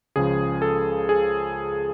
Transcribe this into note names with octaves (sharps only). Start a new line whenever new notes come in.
C#2 C#3 F3 G#4
A4
G#4